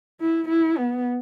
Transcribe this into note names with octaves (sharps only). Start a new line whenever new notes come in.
E4
E4
B3